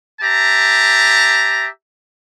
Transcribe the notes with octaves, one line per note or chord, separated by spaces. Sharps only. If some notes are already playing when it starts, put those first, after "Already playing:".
G4 E5 A5 A#5